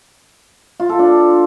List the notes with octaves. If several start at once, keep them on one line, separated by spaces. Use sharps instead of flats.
F4
A4
D4